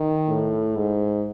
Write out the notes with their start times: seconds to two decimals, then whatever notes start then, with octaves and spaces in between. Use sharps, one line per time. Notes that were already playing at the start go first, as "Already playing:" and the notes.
Already playing: D#3
0.28 A2
0.76 G#2